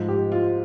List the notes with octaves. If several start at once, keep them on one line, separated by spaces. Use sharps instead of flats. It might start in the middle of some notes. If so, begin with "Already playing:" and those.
Already playing: G#2 F3
G4
F4